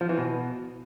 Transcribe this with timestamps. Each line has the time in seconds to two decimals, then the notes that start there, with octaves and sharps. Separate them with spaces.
0.01 F3
0.09 E3
0.18 B2